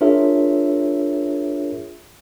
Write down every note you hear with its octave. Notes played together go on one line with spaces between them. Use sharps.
D4 F4 G#4 A#4 C#5 E5